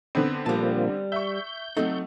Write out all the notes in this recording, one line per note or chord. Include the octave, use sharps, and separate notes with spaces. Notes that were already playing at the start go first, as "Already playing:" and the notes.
D3 B3 C4
A#2 F3 G3 A#3 A5
E5 C#6 G6
F#3 A3 C4 D#4